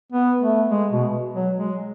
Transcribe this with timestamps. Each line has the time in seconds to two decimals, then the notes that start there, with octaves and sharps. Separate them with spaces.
0.12 B3
0.41 A3
0.69 G#3
0.92 B2
1.34 F#3
1.56 G#3